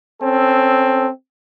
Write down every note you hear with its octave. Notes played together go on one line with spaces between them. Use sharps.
C4 C#4 A4